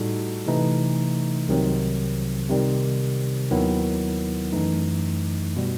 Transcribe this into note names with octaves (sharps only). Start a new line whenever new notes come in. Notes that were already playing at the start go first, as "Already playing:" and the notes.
Already playing: A2 G3 D#4 F#4 A4
C3 E3 A3 D#4
C2 C3 D#3 F#3 C4
C3 D#3 G3 C4
D#2 D#3 F#3 B3 E4
F#2 E3 A3 D#4
B2 G3